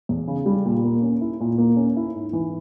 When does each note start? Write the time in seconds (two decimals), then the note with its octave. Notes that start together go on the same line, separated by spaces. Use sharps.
0.09 E2
0.27 C#3
0.46 G3
0.65 A#2
0.84 A#3
1.02 C#4
1.21 E4
1.40 A#2
1.58 A#3
1.77 C#4
1.97 E4
2.14 G#2
2.33 E3